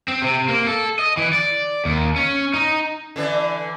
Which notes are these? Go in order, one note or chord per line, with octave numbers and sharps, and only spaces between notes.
C4
C3
A#3
A4
D#5
E3
D5
D#2
C#4
D#4
D3 E3 D4